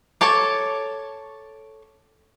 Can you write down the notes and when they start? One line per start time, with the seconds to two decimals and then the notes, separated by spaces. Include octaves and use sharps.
0.21 A4 C#5 A5 D6